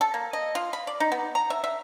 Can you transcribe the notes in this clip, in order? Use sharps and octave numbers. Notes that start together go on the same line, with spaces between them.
A4
A#3
D#5
F4
B5
D5
D#4
B3
A#5
E5
E5